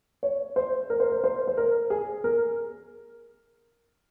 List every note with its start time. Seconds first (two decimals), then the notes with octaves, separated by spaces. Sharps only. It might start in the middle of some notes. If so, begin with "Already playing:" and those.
0.23 C#5
0.56 C5
0.90 A#4
1.00 C5
1.10 A#4
1.24 C5
1.47 C5
1.57 A#4
1.90 G#4
2.24 A#4